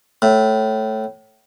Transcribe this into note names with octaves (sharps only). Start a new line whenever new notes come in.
A2